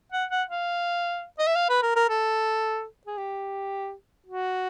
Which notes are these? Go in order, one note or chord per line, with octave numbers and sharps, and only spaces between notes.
F#5
F#5
F5
D#5
E5
F5
B4
A#4
A#4
A4
G#4
G4
F#4